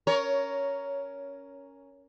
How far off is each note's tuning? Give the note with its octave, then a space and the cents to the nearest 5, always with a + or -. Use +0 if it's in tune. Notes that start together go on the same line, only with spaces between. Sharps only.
C#4 +5 A#4 +0 C#5 +15